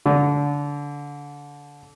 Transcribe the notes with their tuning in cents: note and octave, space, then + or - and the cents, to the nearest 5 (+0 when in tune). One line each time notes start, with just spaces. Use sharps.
D3 -25